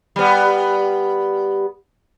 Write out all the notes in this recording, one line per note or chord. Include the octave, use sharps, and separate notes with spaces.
G3 B3